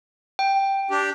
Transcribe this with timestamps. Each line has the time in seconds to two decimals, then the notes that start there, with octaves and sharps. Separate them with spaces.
0.39 G5
0.91 D4 G4